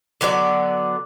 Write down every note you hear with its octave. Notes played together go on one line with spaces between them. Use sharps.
D3 F#3 B3 D5